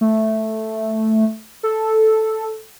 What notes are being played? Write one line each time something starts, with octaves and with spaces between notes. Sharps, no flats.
A3
A4